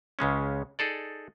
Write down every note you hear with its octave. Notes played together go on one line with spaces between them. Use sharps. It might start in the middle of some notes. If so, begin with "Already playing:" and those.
C#2 C#3 G#3 C#4
D#4 G#4 A4 D5